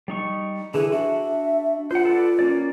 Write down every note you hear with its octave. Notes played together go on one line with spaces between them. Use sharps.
G3 D#4 C#6
D3 E3 G#4
D4 F#4 E5
F4 C5 F#5
A4 B4 D5
A#3 C#4 D5